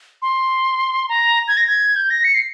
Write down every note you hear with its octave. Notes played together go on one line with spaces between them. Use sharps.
C6
A#5
G#6
A#6
G#6
G6
A#6
C#7
C7